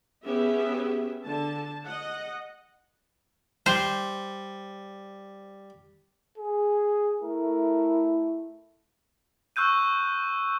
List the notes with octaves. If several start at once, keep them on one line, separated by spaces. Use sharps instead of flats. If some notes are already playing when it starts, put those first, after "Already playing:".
B3 C#4 G4 G#4 E5
D3 A5
D#5 F#5
G3 C5
G#4
A3 E4 A#4
C#6 E6 F#6 G6 D#7